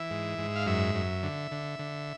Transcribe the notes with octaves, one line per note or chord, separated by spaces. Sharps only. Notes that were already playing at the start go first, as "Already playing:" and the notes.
Already playing: E3 E5
G#2
G#2
F5
F#2 E5
F#2
D3
D3
D3